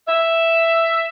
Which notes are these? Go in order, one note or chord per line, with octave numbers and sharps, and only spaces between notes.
E5